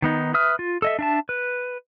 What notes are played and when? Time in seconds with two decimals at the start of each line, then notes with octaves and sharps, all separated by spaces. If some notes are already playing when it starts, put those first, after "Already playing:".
0.02 D#3 B3 D#4
0.34 B4 E5 D#6 F6
0.59 F4
0.82 A4 D#5 E5
0.99 D4 E5 A5
1.29 B4